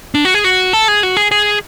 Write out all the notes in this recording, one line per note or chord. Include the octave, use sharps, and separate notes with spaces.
D4
F#4
G#4
F#4
A4
G#4
F#4
G#4
G#4